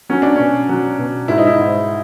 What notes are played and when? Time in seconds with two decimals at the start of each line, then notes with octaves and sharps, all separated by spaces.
0.09 F#3 C#4
0.22 D4
0.36 B2 C#4
0.69 F#3
0.99 B2
1.28 G#2 E4
1.38 D#4
1.47 E4
1.59 G#2